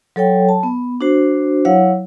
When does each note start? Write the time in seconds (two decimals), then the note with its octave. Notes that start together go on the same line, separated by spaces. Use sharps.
0.16 F#3 A4 C#5 G5
0.49 A5
0.63 B3
1.01 D4 F#4 C5
1.65 F#3 E4 C#5 F5 F#5